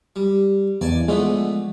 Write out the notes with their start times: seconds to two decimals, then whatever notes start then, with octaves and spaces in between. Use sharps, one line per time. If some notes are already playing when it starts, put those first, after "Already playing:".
0.16 G3
0.81 E2 D5 G#5 A5
1.08 D3 F3 G#3 A3 B3